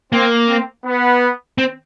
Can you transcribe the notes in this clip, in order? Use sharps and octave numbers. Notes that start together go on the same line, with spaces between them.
A#3 C4
C4
B3
C4